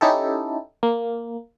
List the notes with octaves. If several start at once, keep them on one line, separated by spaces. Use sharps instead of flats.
C#4 D#4 E4 G4 A4
A#3